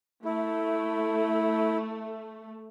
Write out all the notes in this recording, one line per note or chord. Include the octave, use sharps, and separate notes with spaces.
A3 E4